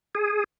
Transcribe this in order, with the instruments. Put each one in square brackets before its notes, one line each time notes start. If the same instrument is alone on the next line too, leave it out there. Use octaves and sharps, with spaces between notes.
[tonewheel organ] G#4